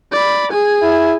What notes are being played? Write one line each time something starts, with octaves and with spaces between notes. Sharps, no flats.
D5 B5
G#4 G#5
E4